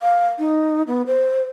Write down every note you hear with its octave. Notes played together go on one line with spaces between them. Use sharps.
F5
D#4
B3
C5